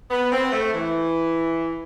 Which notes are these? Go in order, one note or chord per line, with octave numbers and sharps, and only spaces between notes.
B3
C4
A3
E3